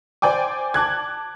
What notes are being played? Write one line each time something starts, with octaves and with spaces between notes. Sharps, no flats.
C5 D5 G5 G#5 D6
A5 D6 F#6 G#6